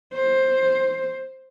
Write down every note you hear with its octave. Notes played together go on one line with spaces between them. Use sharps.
C5